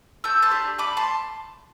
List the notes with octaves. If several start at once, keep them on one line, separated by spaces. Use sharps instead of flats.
A3 E6 G6
A5 C6
D4 G4
A3 B5 D6
A5 C6